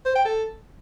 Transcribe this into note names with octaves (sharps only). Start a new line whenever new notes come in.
C5
G5
A4